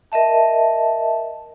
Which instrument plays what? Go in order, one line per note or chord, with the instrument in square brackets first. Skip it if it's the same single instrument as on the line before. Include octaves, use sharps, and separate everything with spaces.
[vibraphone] A#4 D#5 E5 A5